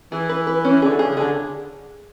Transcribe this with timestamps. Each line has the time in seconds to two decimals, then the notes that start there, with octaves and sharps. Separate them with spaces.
0.12 E3 G#4
0.29 B4
0.47 B4
0.65 C#4
0.82 D3 G#4
0.99 C#3 G#4
1.17 D3 G#4